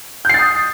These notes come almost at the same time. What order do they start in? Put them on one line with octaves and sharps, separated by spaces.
G6 C7 A6 D#6